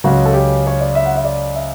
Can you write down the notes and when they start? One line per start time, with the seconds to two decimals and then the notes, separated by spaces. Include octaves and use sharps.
0.04 C#2 C#3 F#3 C#4 F#4
0.26 A4
0.34 G4
0.67 C#5
0.81 D5
0.95 E5
1.06 F#5
1.16 E5
1.25 D5
1.55 E5